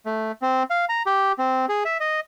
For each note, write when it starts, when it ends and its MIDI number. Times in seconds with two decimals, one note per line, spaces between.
0.06 0.32 57
0.42 0.63 60
0.70 0.85 77
0.89 1.03 82
1.06 1.32 67
1.38 1.66 60
1.69 1.84 68
1.85 1.97 76
2.00 2.20 75